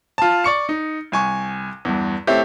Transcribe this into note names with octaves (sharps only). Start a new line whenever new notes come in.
F4 A5
D5 C#6 C#7
D#4
C2 G#5 C#6
E2 G2
A3 C4 C#4 E4 G4